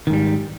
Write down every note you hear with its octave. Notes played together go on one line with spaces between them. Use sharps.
G#2 D#3 G3